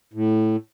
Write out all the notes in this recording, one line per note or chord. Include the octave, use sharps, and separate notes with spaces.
A2